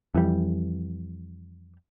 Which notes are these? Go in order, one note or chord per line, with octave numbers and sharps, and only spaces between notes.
F2 E3 G3